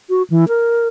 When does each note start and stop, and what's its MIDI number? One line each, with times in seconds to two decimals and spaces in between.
0.09 0.23 66
0.30 0.45 52
0.48 0.88 70